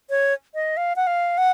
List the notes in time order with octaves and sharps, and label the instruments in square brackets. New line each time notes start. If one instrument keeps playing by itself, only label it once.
[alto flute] C#5
D#5
F5
F#5
F5
F#5